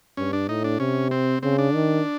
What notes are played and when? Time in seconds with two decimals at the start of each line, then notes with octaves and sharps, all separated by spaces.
0.17 G2 C#4
0.33 D4
0.49 A2 D#4
0.64 D4
0.80 C3 C#4
1.11 C4
1.43 C#3 C4
1.58 D4
1.74 D#3